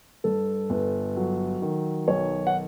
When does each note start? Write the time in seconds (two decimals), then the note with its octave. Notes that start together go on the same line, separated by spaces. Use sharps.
0.24 G2 A4
0.70 G1
1.16 F#3
1.62 D#3
2.08 B1 C#5
2.47 F#5